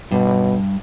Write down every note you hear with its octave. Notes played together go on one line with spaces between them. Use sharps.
G2 B2